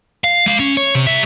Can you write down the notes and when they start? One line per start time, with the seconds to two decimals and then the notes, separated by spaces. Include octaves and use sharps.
0.24 F5
0.46 G#3 F5
0.60 C#4
0.77 C#5
0.95 C3
1.07 G3 E5